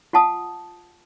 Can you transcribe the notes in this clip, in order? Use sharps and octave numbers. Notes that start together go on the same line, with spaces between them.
F4 F#5 A5 D#6